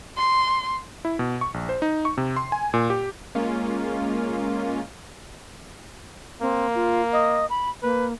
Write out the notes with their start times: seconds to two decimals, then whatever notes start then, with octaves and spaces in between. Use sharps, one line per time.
0.17 C6
1.05 E4
1.19 B2
1.41 C#6
1.54 A#1
1.69 C5
1.82 D#4
2.05 C#6
2.18 C3
2.36 C6
2.52 G#5
2.74 A#2
2.90 G4
3.35 G#3 A#3 C#4 F4
6.42 A#3 C4
6.75 F4
7.13 D#5
7.50 B5
7.83 A#3 B4